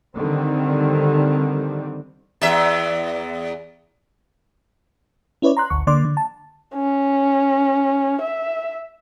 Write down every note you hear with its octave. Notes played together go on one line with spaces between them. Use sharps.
D3 D#3 G3 C4
E2 E5
C#4 E4 B4 C#5 D5
A#5 C6 F#6
G#1 D2 C#6
D3 A#3 D5 C6 D6
D3
A5
C#4
E5